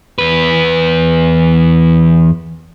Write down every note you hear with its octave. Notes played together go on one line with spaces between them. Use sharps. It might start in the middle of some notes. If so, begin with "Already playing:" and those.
E2 B4